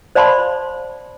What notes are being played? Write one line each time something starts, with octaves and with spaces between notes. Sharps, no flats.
C5 D5 F5 A5 B5 C6